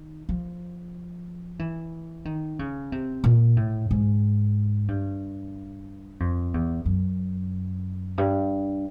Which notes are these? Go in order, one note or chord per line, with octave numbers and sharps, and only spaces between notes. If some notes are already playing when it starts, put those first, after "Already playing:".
Already playing: D#3
F3
E3
D#3
C#3
C3
A#2
A2
G#2
G2
F2
E2
F#2
G2